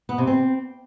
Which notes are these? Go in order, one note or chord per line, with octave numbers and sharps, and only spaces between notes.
B3
C3
C4